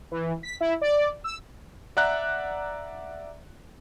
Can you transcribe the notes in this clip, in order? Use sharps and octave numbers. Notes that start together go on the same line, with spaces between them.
E3
B6
E4
D5
E6
D5 E5 F#5 A#5 F#6